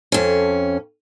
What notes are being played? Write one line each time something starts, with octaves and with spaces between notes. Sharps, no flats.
F2 C#4